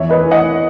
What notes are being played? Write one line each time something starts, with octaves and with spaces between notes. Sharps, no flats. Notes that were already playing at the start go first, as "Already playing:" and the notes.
Already playing: E2 C#5 E5
B4 D#5
E3
D#5 F#5